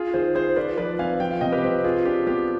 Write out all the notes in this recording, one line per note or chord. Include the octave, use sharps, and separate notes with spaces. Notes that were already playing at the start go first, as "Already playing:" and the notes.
Already playing: F4 G#4
D#3 G#4 C5
F4 G#4 C5
F4 B4 D5
F3 B4 D5
C4 F5 G#5
F3 G5
F5
C3 D#5 G5
G4 B4
C4
F4 G#4
D4 G4
B3 G4